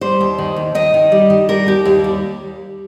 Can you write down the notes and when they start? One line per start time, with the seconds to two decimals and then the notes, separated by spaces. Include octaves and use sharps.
0.01 G3 C5
0.20 D#2
0.38 D#3
0.56 D#2
0.75 D#3 D#5
0.94 D#3
1.12 G3
1.30 D#3
1.49 G3 A#4
1.67 D#2 G4
1.85 D#2
2.04 G3